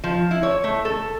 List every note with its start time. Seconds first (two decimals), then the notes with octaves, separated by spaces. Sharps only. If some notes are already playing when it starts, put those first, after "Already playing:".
0.04 F3
0.31 E4
0.43 C#5
0.64 A3
0.85 A4